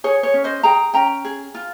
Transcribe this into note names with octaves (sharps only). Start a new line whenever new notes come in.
G#4 C#5
C#5
C#4
C5 D#5
G#4 G5 A#5
C#4 G5 A#5
G#4
F4